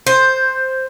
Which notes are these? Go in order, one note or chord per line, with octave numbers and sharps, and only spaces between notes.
C5